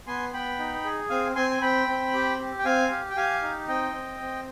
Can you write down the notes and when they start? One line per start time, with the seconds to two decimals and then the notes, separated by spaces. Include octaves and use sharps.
0.07 B3 G#5 C6
0.33 B3 G5 B5
0.59 D#4
0.84 G#4
1.10 C4 F5 G#5
1.36 C4 G#5 C6
1.50 G#5
1.62 C4 G5 B5
1.88 C4
2.13 G4
2.39 G4
2.59 G5
2.65 C4 F5 G#5
2.90 G4
3.10 G5
3.16 G4 F5 G#5
3.42 D#4
3.68 C4 D#5 G5
3.94 C4
4.20 C4